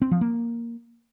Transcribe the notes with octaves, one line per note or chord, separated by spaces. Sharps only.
C4
F3
A#3